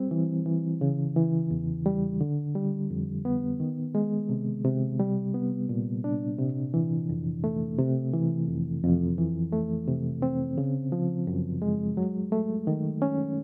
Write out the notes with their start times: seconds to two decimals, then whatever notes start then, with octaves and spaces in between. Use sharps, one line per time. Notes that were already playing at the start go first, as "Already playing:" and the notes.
Already playing: G3 C4
0.11 E3
0.46 E3
0.81 C#3
1.16 E3
1.51 E2
1.86 G3
2.21 D3
2.55 G3
2.90 F2
3.25 B3
3.60 D#3
3.95 G#3
4.29 C3
4.64 C3
5.00 G3
5.34 B3
5.69 A#2
6.04 D4
6.38 C3
6.74 E3
7.09 F2
7.44 A3
7.78 C3
8.13 E3
8.49 F2
8.83 F2
9.18 E3
9.53 A3
9.87 C3
10.22 C4
10.58 C#3
10.92 F3
11.27 F#2
11.62 G#3
11.97 F#3
12.32 A3
12.67 D#3
13.02 C#4